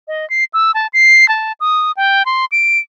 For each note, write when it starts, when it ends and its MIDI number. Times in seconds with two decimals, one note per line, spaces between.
0.08 0.28 75
0.30 0.44 96
0.53 0.71 88
0.74 0.87 81
0.93 1.27 96
1.29 1.52 81
1.60 1.92 87
1.97 2.25 79
2.25 2.45 84
2.52 2.79 98